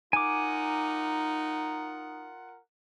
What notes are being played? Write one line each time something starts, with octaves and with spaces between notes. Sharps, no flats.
D#4 F4 A#4 F#5 G#5 D6